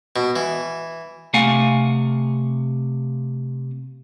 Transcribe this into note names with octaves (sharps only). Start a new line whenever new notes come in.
B2
E3
C3 A3 F5 F#5 G#5